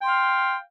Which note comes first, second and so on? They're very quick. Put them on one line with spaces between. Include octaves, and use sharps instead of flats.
G5 C6 F5